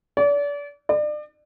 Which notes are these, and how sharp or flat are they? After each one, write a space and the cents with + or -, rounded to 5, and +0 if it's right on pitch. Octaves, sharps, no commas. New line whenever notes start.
D5 -35
D5 +35